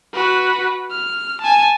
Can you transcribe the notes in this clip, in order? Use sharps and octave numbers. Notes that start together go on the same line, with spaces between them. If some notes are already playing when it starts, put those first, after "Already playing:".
F#4 B4
F6
G#5 A5